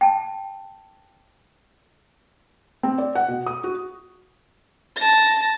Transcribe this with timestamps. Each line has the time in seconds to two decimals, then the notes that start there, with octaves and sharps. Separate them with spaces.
0.01 G5 A5
2.83 C4
2.98 D5
3.15 F#5
3.28 B2
3.46 D#6
3.64 F#4
4.97 A5 A#6